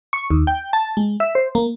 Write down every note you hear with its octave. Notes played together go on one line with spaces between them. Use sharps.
C#6
D#2
G5
A5
G#3
E5
C5
A#3